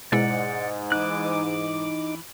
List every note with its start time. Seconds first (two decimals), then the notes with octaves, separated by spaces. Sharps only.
0.12 G#2 B2 G#3 E4 D5 F#5
0.92 E3 D#4 D6 F#6